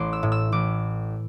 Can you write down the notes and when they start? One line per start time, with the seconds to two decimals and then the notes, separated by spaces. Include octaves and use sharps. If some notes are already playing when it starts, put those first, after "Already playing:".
Already playing: A1 C6 D6
0.13 E6
0.23 A2
0.32 E6
0.52 A1 D6